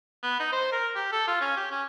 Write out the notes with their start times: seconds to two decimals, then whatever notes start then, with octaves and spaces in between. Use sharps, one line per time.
0.23 B3
0.40 D#4
0.52 C5
0.72 A#4
0.96 G4
1.12 A4
1.28 F4
1.41 C#4
1.57 G4
1.71 C#4